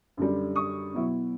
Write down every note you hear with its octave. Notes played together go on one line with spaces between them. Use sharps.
F#2 D3 G3
C#6 D#6
B2 F#3 B3 E4